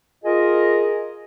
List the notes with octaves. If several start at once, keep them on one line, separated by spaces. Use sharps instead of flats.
F4 G#4 A#4 D#5